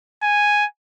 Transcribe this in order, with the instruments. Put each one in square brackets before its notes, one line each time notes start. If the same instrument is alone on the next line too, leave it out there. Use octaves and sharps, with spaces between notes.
[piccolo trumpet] G#5